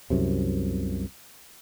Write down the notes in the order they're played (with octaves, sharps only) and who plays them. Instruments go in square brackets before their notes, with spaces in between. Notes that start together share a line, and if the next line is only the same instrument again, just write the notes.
[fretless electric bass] C2 F#2 C3